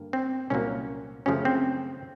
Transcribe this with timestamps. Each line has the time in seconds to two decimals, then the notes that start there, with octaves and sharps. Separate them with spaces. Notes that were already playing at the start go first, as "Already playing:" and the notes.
Already playing: G2 D3 A#3
0.13 C4
0.50 C2 A#2 F#3 A#3 C#4
1.26 F#2 C#3 F3 A3 C#4
1.45 C4